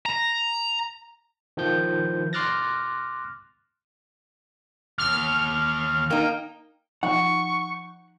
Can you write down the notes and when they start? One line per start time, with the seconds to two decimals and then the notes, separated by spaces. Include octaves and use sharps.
0.06 A#5
1.57 D#3 F3 G6
2.33 C6 D6 F6 F#6 A6 A#6
4.98 D#2 F6
6.11 A#3 D#4 G5
7.03 F3 D#4 F#5 C#6